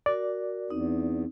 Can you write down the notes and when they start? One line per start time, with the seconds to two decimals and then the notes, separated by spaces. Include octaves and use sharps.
0.06 F#4 A#4 D5
0.70 E2 C4 D#4